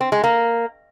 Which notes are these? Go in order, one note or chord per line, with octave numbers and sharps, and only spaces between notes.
C4
G#3
A#3